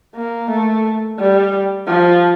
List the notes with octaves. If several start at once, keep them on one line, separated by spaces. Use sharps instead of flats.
A#3
A3
G3
F3